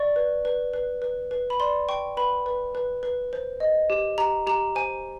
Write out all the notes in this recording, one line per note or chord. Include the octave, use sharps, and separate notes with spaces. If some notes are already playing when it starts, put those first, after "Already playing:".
Already playing: D5 C#6
B4
B4
B4
B4
B4
B5
D5 C6
G5 C#6
B4 B5
B4
B4
B4
C5
D#5
G4
G4 A#5
G4 A#5
C5 G#5